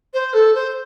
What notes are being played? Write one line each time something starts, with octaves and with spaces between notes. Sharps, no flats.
C5
A4
C5